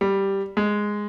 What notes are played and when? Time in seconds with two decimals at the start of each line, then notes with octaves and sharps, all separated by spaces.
0.01 G3
0.57 G#3